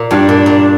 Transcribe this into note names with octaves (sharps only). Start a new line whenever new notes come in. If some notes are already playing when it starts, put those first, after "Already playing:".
Already playing: A#2
G2 D4 F4
A#2
A#2